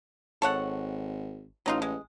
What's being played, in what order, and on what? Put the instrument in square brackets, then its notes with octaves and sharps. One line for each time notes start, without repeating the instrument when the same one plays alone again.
[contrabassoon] G#1 [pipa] A4 C#5 F#5
[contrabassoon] A1 [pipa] F#3 D#4 F4
[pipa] G#3